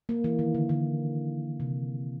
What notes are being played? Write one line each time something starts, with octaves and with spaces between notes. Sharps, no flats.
A#3
E3
D#3
D3
D3
C3